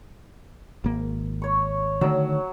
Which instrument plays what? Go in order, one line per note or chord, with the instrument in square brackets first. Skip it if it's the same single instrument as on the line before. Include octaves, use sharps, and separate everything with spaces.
[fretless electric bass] G#1 A#3
[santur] C#5 C#6
[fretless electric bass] D3 D#3 A3 [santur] F#3 E6